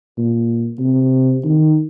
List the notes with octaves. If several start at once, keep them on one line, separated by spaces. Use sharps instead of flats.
A#2
C3
D#3